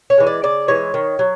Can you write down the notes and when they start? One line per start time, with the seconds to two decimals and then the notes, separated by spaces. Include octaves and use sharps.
0.10 C#5
0.18 E3 G#3
0.27 D5
0.43 C#3 D5
0.68 E3 G#3 C#5
0.94 D#3
1.19 F#3